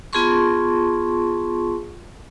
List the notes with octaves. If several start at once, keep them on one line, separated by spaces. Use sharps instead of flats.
B3 F4 G#4 A5 C6 C#6